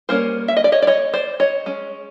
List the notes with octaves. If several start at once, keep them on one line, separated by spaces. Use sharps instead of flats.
G3 A#3 C#4 A#4 C5
E5
D#5
D5
C#5 D#5
D5
C#5 D#5
C5 D5
C#5 D#5
G#3 C#4